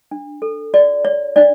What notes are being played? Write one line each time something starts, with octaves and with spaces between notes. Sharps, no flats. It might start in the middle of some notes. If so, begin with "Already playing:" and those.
D4
A4
F#4 D5
C#5
D4 D5